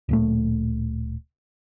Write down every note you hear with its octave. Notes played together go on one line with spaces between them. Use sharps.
D1 A#2 A3